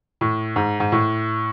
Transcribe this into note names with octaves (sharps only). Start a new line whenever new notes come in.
A2
G#2
G#2
A2